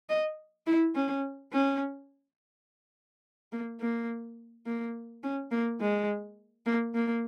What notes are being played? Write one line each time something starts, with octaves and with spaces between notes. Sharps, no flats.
D#5
E4
C#4
C#4
A#3
A#3
A#3
C#4
A#3
G#3
A#3
A#3